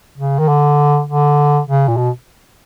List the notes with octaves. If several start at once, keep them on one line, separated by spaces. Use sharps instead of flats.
C#3
D#3
D3
D3
C#3
A#2
B2